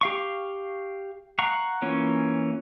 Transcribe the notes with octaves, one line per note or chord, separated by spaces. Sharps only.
G4 F5 C#6
F5 F#5 A#5 C#6
E3 A#3 C#4 F4 C#5